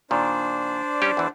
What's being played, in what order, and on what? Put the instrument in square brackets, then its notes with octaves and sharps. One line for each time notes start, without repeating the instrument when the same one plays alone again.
[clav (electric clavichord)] A#2 D#3 [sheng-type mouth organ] D4 C5 D5
[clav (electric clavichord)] G3 C#4 G4
E2 E3